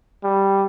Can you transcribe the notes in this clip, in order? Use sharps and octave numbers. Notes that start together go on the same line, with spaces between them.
G3